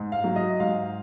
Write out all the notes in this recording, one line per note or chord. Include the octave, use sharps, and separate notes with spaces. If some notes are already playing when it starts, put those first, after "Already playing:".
Already playing: G#2
F5
F#3
D#5
G#2 F5